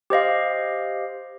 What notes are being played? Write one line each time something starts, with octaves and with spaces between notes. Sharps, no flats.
G4 C5 D#5 F5